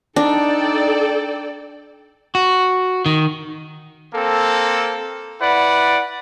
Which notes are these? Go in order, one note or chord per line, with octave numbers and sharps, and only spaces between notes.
D4 D#4 A4 D5 G5
F#4
D#3
A#3 C4 A4
E4 B4 D5 F#5